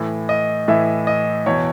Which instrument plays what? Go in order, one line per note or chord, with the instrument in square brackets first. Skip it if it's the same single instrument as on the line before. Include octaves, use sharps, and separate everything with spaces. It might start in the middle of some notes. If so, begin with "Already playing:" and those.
Already playing: [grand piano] A2 E3
D#5
A2 E3 E5
D#5
E2 B2 C#5